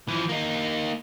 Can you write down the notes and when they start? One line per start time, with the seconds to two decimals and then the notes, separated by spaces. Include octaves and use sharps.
0.08 E3 F3
0.29 A#3 D#4